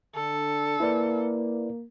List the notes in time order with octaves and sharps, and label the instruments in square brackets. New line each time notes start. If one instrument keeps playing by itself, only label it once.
[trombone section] D3 [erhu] A4
[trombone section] A#3 [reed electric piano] E4 B4 D5